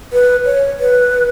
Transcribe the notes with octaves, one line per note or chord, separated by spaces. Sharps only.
B4
C#5
B4